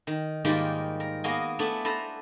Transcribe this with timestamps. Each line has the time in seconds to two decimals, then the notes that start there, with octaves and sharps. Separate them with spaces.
0.07 D#3
0.45 G#2 D#3 G3 A#3 F4 G4
1.00 A#4
1.24 A#3 B3 F#4 G#4 D#5 F5
1.59 A3 B3 D4 E4
1.85 A4 B4 C5 A#5